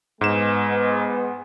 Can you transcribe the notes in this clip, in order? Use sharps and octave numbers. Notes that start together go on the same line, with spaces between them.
G#2 G#3 B3 E7